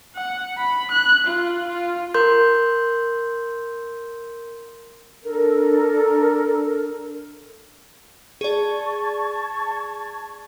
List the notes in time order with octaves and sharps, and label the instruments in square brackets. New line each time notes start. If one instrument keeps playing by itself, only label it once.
[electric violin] F#5
B5
F#6
F4
F4
[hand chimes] A#4 C6 G6
[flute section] D4 A4 A#4
[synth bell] G#4 D5 [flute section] A5 C#6 G#6